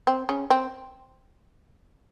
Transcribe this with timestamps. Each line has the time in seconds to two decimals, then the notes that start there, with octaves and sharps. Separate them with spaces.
0.07 C4
0.29 C#3 C#4
0.50 C4